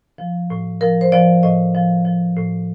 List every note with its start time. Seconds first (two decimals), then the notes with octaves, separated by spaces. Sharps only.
0.18 F3
0.50 A2
0.81 F3 A#4
1.01 C5
1.12 F3 D5
1.43 A2 D#5
1.75 F3
2.05 F3
2.37 A2